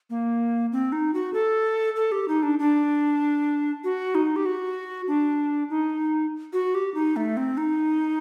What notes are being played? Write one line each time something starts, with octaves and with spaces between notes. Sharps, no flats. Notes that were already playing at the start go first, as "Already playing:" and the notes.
A#3
C4
D#4
F#4
A4
A4
G4
D#4
D4
D4
F#4
D#4
G4
F#4
D4
D#4
F#4
G4
D#4
A3
C4
D#4